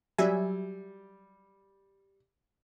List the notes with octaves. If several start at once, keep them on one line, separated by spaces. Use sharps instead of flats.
F#3 G3 E5 G#5